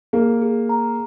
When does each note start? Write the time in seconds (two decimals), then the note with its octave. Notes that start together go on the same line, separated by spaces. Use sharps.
0.13 A#3 G#4
0.42 G#4
0.69 A#5